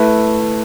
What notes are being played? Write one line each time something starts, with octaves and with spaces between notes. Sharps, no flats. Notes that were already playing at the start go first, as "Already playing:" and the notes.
Already playing: A3 E4 B4